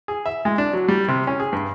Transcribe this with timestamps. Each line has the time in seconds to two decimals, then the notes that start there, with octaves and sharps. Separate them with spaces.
0.08 G#4
0.26 E5
0.45 G#3
0.58 D4
0.73 F#3
0.88 G3
1.08 C3
1.27 C#4
1.40 G#4
1.53 G2